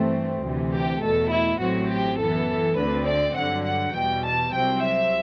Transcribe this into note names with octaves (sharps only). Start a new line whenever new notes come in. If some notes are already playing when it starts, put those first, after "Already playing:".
Already playing: G2 E3 A3 C4
D2 C3 E3
G4
E2 B2 A3 A4
E4
A1 A2 F#3 C4 F#4
G4
F#2 E3 B3 A4
D2 D3 A3 C4 B4
D5
G2 D3 F#3 F#5
F#5
E2 B2 G3 G5
A5
C2 C3 F#3 C4 G5
E5